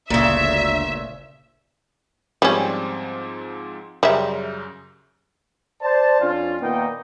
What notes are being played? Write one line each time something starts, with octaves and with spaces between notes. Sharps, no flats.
G1 D2 A#2 C#3 E5
G#2 F3 G3 C4 C#4
F#2 C#3 G3 E5 A#5
C5 D5 A5
F2 C#4 D4 F4
A#2 D#3 A#3 B3 D#4 G5